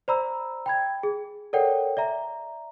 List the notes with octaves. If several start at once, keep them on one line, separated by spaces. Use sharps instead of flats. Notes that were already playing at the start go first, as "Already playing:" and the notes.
C5 D5 A#5 B5 E6
G5 B5 G#6
G#4
A4 A#4 C#5 D5 F#5 G5
D5 E5 A#5